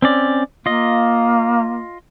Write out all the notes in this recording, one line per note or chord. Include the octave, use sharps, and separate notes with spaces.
C4 C#4 D5
A#3 F4 D#5